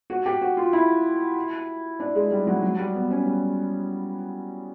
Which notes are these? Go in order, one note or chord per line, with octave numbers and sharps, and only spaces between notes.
F#4
G4
F#4
F4
E4
D4
G#3
G3
F#3
F#3
G3
B3
C#4
G3